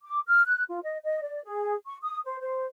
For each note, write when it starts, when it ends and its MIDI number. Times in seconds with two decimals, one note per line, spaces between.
0.03 0.20 86
0.27 0.42 89
0.46 0.63 90
0.69 0.79 65
0.84 0.98 75
1.04 1.19 75
1.22 1.41 74
1.45 1.75 68
1.86 1.97 85
2.03 2.18 87
2.25 2.38 72
2.40 2.65 72